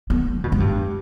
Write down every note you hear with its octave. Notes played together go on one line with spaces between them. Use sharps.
B3
D3
B2
G#2
G2